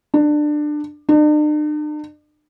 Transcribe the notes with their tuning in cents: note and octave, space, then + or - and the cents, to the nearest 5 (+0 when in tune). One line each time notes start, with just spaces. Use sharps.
D4 +20
D4 +45